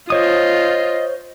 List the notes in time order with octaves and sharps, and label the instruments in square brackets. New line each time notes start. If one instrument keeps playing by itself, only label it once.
[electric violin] F4 [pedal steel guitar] C5 C#5 D#6 [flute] D#5